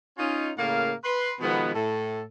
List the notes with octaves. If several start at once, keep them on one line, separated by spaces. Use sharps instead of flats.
C#4 D#4 F4
A2 C#3 A#3 A#4 F5
B4 C6
B2 D#3 F3 G#3 B3
A2 A4